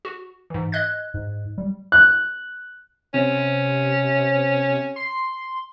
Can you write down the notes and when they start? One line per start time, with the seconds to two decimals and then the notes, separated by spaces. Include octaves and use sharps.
0.05 F#4
0.50 G#2 E3
0.72 D#5 F#6 G#6
1.14 G#2
1.58 G3
1.92 F#6
3.14 C3 C#4
4.96 C6